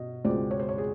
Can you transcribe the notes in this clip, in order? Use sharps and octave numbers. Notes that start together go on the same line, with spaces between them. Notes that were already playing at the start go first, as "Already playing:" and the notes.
Already playing: B2 D#5
C#2 B2 G#3 C4 D5
C#5
C5
C#5
G#4